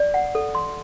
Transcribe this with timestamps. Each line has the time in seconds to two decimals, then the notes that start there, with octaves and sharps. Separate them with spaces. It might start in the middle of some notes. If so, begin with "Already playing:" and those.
Already playing: D5
0.14 F#5
0.35 A4
0.55 C6